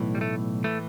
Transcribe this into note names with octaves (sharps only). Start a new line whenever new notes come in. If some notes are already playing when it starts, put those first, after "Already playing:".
Already playing: B1 A2 E3
G3
A3
A2 E3 A3